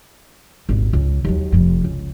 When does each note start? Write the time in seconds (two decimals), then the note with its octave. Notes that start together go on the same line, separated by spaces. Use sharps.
0.69 D#1 G#1
0.93 C#2
1.24 D#2 F#3
1.52 F1 F2
1.84 C#2